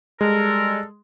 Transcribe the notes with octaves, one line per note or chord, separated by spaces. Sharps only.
G3 G#3 A4 A#4